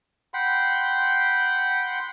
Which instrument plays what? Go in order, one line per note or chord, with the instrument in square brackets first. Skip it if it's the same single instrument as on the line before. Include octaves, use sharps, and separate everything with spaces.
[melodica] F#5 G5 B5 C6